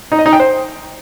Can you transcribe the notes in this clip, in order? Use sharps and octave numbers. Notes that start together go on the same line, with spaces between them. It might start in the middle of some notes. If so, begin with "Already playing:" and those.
D#4
D#5
D#4
G5
C5